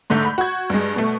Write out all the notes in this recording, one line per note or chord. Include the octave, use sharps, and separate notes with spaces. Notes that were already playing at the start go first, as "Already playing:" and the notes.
G#2 D3 A3 G6
B5
F#4 G#6
G2 G#3
B2 A3